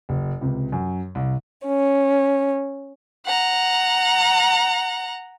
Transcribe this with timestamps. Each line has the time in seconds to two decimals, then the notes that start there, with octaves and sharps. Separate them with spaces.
0.09 F#1
0.41 C#2 C3
0.72 F#2
1.15 C2
1.66 C#4
3.26 F#5 A#5